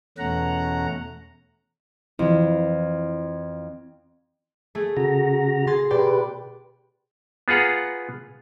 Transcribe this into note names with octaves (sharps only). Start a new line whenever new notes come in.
E2 B2 A3 C#4 F#5 A#5
F2 E3 F3 E4
A3 G#4
C#3 F#4 A#5
G#4 C6 A6
B2 G4 B4 D5 G5
B3 F4 G#4 F#5 A#5